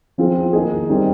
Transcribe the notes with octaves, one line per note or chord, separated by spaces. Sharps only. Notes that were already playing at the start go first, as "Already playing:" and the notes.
F3 C4 F4 G#4
D#3 A#3 D#4 G#4
D#3 G3 C4 D#4 G4